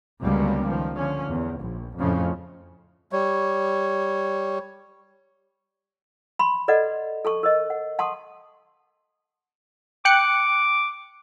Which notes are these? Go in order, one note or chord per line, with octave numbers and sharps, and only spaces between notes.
C#2 D3 F#3 G3 A#3 B3
D#3 F3
D3 F3 C#4
E2
A#1
F2 A2 C#3 F3
G3 C#5
B5 C6
A4 B4 D5 D#5 F#5
A4 A5 C#6
A#4 C5 D#5
F#5
F#5 A5 C6 C#6 D#6
G5 D6 F#6 C#7